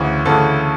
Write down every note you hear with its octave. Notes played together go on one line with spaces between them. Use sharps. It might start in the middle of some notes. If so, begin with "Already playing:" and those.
Already playing: D2 C#3 E3
D2 C#3 E3 A4